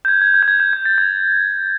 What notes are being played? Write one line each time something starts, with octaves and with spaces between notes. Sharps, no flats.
G6
G#6
G#6
G#6
G6
G#6
G6
G#6
A6
G#6